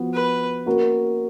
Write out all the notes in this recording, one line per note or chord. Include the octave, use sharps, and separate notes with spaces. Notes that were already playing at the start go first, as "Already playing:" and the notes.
Already playing: F3 B3 F#4
B4
A#3 C#4 F#4 A#4